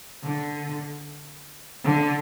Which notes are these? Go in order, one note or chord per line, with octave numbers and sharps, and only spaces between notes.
D3
D3